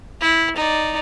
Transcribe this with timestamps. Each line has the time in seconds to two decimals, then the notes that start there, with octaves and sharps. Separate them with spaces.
0.21 E4
0.56 D#4 D5